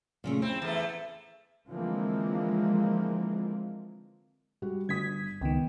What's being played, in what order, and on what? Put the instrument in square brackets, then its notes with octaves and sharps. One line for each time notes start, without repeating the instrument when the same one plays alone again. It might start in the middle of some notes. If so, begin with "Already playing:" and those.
[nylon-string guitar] A#2 C#3 A3
[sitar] C4 [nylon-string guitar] E4
[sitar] E2 A3
[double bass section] D3 E3 F3 G#3 A#3 C4
[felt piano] G3 F#4
[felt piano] G1 D#6 [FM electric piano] G#6 B6
[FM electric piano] C#2 D#3 [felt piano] B3 G5